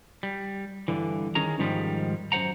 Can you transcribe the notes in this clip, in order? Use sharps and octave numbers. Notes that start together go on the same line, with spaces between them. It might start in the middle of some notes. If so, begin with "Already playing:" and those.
G3
G2 D3 E3
D#3 C#4 G#4 A#4 A#5
G#2 D#3 F3 G3 G#3
F#2 E3 C5 F#5 A#5